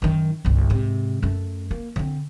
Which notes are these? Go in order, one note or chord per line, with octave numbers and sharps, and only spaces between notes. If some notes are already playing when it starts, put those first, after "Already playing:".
F#2 D#3
G1 C2
G#2 C3
F#2 A3
A#3
D3 C4